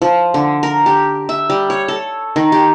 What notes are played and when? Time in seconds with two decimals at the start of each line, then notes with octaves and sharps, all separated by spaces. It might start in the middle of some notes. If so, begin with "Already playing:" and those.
0.02 F3
0.34 D3
0.63 A#4
0.86 G4
1.29 E5
1.50 G3
1.70 C#5
1.88 A4
2.36 D#3
2.52 G4